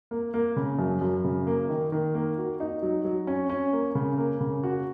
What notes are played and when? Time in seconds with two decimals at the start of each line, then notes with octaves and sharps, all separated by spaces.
0.11 A#3
0.34 A#3
0.57 C#3
0.79 F#2
1.01 F#2
1.24 C#3
1.47 A#3
1.69 D#3
1.92 D#3
2.14 A#3
2.38 F#4
2.60 D#4
2.83 F#3
3.05 F#3
3.27 C#4
3.49 C#4
3.73 A#3
3.95 C#3
4.18 A#3
4.41 C#3
4.63 F#4